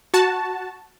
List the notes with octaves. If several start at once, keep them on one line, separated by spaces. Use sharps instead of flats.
F#4 A5